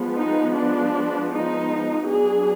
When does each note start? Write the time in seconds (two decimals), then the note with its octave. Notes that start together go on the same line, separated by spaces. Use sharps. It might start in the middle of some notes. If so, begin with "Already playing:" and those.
Already playing: F3 G#3 B3
0.16 D#4
0.55 D4
1.32 D#4
2.09 F#3 B3 D4 G#4